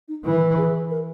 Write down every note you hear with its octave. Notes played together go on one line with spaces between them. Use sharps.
D#4
E3 E4
G#4
A#4